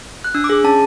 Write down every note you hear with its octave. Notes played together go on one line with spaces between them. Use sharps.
F#6
D4 E6
D6
G#4
C#4 A5